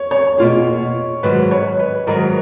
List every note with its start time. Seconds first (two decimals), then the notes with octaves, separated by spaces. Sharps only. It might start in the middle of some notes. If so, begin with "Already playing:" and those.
Already playing: C#5
0.11 C#5
0.38 B2 A#3 F4 G#4
1.23 G#2 D#3 F#3 B4
1.51 C#5
1.79 B4
2.07 G#2 D#3 F#3 A#4